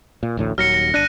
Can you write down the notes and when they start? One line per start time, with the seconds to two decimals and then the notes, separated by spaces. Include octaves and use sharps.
0.23 A#2
0.37 A1 D2 A2
0.58 D#1 D#2 F#3 F6 A#6 C#7
0.74 A#6
0.94 G1 D4 F#6 A#6 D#7